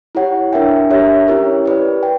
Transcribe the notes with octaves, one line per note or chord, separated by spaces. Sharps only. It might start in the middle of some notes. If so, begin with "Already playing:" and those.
E4 G4 C#5 F#5
D4 A#4 E5 G5
D4 G4 A#4 C#5 E5
C#4 E4 G4 A#4 C#5
G4 B4 D5
G5